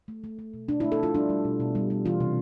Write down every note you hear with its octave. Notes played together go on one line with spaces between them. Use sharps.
A3
A3
A3
B2
B2 D4
E4
A3
A4
A3 F4
G3 D4
G3
B2
B2
G3
G3
E3 F4
C3